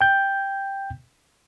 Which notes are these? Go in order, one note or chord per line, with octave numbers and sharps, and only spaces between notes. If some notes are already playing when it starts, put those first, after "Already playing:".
G5 G6